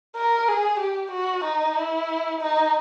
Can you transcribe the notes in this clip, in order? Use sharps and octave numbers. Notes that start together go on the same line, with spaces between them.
A#4
G#4
G4
F#4
D#4
E4
D#4